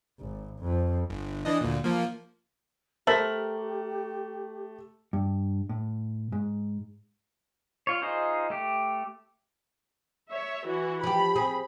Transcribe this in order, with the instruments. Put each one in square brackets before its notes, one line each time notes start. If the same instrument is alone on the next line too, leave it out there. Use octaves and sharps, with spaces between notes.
[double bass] G#1
F2
[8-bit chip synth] G1
E3 D4 D#5
D2 A#2
F3 A#3
[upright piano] A3 F#7 [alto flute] G4 [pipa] A#4 [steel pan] C5 E5 A5
[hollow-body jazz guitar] G2
A2
G#2
[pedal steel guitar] F4 C#5
D#4 F4 G#4 C5
A3 G4
[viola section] C#5 E5
E3 F#4
[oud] F3 G4 [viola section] B5
[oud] C4 G#4